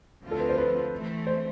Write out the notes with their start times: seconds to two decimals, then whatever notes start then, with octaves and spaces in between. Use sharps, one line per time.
0.23 D2 D3 F3 C4 F4
0.31 A4
0.40 B4
0.49 C5
0.57 B4
0.92 E3 A3 C4
1.27 C5